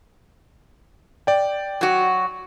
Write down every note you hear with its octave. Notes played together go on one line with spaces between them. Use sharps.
D5 G5
F#3 F#4